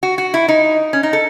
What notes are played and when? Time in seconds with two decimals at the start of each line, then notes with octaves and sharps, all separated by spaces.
0.03 F#4
0.18 F#4
0.34 E4
0.48 D#4
0.93 C#4
1.03 D#4
1.13 A4